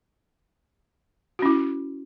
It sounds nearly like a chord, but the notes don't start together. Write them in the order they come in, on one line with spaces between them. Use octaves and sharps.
F#4 C#4 E4